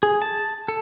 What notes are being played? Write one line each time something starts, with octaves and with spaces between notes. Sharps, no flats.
G#4
A5
A4